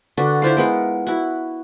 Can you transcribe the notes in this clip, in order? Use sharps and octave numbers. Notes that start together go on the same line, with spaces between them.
D3 D4 F#4 B4
E4 F4 C5 F5
G#3 B3 A#4
E4 F#4